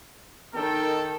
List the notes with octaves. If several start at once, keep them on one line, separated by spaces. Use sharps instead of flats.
D#3 A4 G5